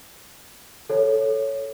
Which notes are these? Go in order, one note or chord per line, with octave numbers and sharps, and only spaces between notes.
A4 C#5